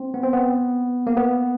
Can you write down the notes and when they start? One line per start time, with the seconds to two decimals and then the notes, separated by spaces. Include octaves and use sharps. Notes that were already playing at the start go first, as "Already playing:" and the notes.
Already playing: C4
0.14 B3
0.23 C4
0.33 B3
1.07 A#3
1.17 B3